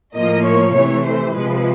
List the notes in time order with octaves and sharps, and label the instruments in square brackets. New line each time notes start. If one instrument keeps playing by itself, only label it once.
[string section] A2 F3 A#3 D#5
C#5
C3 E3 A3 C#5
C5
C3 F3 G#3 B4